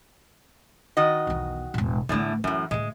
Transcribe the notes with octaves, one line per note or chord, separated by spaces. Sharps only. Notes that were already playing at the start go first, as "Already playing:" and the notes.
D#3 F#4 D#5
B1 E2
E1 A2
A1 E2 A2 D3 A3
F#2 A2 E3
D2 A2 G#3